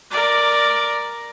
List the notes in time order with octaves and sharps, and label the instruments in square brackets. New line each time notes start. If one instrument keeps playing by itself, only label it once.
[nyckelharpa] A#4 D5